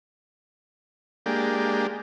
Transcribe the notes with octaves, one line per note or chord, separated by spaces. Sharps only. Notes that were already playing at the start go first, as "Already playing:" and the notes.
G#3 A#3 D4 G4